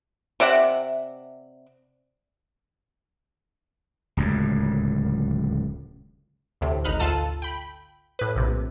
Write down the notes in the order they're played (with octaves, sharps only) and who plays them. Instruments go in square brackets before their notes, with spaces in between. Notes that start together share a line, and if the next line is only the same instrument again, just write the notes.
[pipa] C3 D5 E5 F#5
[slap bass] D1 C#2 F#2
[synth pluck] D2 A2 C3
G#1 D#4 B5 F6 F#6
D2 F4 A4 A5 D#7
G5 B5
A2 B4
A#1 C3